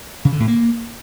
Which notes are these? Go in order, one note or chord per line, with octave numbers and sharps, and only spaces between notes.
C#3
D3
A2
A#3